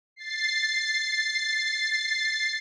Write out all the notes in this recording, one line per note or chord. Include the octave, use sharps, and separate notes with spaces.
A6 C7